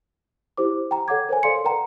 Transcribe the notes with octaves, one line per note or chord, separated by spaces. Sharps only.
E4 G4 C5 D6
G5 A#5
A4 C#5 F#5 G5 D6 G#6
A#4 C5 C#5 G#5
A4 D5 F5 C6 C#7
A#4 B4 F#5 G5 A#5